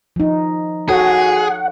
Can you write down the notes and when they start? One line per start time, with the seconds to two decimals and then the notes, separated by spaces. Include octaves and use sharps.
0.16 F3 D#4
0.89 F#4 G#4 A4 C#5 F#5